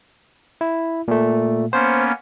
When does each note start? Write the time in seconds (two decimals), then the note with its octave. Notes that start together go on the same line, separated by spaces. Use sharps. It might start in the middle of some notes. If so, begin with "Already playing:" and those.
0.61 E4
1.08 A#2 A3
1.73 A#3 B3 C#4 C5